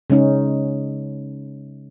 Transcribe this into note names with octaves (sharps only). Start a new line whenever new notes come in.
C#3 G#3 C#4 D#4